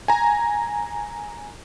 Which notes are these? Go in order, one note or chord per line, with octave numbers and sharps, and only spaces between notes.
G#5 A#5